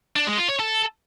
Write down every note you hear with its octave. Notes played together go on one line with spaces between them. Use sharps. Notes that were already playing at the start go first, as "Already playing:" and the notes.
D4
G#3
F4
C#5
A4